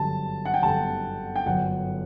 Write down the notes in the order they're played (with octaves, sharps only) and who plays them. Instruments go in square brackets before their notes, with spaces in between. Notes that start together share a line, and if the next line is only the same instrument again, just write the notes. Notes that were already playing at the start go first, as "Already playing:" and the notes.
Already playing: [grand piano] G1 F#2 D3 G3 [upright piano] A5
[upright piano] F#5
G5
[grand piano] G1 F#2 D3 G3 [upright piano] A5
[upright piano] G5
[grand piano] G1 F#2 D3 [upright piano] F#5